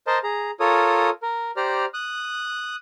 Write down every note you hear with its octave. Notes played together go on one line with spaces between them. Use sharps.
A#4 C5 D#5 A5
G#4 A#5
F4 A4 A#4 C#5 D#6
A#4
G4 C5 D5 A#5 F6
D#6 F#6